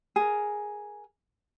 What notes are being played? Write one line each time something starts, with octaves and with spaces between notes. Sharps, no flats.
G#4 A#4